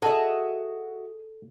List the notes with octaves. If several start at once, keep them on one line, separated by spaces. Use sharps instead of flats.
F#4 G#4 A4 D#5 E5